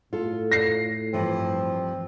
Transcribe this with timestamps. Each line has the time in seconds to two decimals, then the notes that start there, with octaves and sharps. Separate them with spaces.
0.13 A2 F4 A4
0.52 A#6 C7
1.13 G2 E3 F3 C4